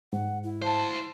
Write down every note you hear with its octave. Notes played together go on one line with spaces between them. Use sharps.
G#2 F#5
E4
D2 G#3 C5 F5 A5